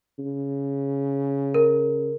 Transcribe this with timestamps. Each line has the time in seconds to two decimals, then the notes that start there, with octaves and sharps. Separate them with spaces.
0.19 C#3
1.54 A#4